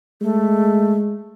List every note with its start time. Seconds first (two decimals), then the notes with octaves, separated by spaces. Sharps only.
0.22 G#3 A3